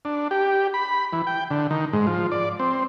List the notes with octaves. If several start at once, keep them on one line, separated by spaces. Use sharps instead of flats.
D4
G4
B5
E3
G5
D3
D#3
G#2
F3
D5
C4